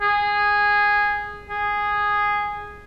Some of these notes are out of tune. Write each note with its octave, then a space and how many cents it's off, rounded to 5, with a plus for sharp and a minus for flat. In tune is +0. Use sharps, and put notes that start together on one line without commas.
G#4 -10
G#4 -10